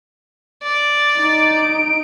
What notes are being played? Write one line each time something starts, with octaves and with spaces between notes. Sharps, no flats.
D5
D#4 D7